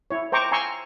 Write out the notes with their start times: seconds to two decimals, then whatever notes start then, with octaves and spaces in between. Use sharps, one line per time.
0.11 E4 C#5
0.32 C5 G5 A#5 C#6 D6
0.52 G#5 A#5 C6 C#6 E6